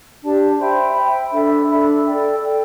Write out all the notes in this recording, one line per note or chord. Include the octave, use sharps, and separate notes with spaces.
D4 G4 D5 A5
C5 E5 G5 B5
C5 E5 G5 B5
D4 A4 E5 B5
D4 A4 E5 B5
A4 D5 G5
A4 D5 G5